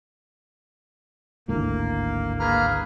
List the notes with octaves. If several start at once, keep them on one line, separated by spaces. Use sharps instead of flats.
G#1 D2 A2 A#3
A#3 G#4 B4 A#5 F6